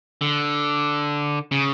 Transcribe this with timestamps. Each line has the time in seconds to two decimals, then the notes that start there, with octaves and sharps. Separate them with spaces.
0.21 D3
1.52 C#3